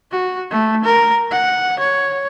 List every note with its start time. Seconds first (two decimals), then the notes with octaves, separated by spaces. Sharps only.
0.12 F#4
0.51 A3
0.84 A#4
1.31 F#5
1.79 C#5